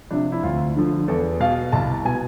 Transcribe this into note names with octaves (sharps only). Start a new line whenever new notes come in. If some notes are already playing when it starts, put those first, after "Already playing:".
C3 F3 D4
E4
D2 F4
D3 F3
E2 A4
B2 F5
C2 A5
B2 G#5